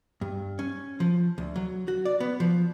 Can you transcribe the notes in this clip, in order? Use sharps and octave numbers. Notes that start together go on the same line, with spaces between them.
G2
C#4
F3
D2
F#3
F#4
D5
B3
F3